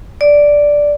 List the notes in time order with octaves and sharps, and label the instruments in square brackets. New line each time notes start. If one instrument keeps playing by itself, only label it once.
[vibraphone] D5